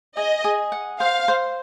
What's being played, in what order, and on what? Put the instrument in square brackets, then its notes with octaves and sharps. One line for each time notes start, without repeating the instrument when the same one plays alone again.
[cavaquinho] G#4 [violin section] D#5
[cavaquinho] G#4
F#5
[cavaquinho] C5 [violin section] F5
[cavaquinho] C5